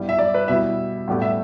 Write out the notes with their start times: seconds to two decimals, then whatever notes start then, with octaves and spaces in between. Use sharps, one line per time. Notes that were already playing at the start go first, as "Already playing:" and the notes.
Already playing: G2 G3 B3 E4
0.09 E5
0.19 D5
0.34 B4
0.48 B2 G3 E4 E5
1.08 A2 G3 B3 G4
1.22 E5